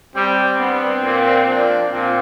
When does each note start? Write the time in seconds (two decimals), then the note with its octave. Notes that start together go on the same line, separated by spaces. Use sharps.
0.15 G3 C4
0.59 B3 D4
1.02 A#2
1.46 F3 A#3 D4
1.90 A#2 C4